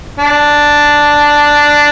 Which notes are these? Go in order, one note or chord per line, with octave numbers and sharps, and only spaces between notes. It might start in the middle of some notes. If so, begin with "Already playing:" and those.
D4